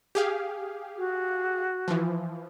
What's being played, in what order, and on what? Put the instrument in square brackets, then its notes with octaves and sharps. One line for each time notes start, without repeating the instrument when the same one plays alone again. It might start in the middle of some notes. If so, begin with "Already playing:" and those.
[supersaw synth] G4 G#4 F5
[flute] F#4
[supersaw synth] E3 F3